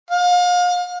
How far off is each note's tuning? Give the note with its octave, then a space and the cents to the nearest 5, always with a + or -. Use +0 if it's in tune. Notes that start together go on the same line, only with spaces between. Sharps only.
F5 +35